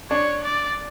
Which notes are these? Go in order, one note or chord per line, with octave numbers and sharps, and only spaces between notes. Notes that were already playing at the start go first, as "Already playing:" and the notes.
D4 C#5
D5